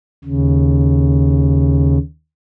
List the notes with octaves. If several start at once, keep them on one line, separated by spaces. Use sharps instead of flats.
D#2 C#3